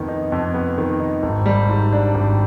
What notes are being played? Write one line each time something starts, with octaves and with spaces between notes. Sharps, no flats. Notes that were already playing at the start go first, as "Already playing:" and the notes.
Already playing: F2 D#3 B3
D#4
F2
B3
D#3
D#4
G#1
G3
G#2
D4
G#1